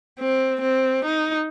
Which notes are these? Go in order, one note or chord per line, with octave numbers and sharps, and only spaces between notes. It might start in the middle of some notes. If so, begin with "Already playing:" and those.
C4
C4
D#4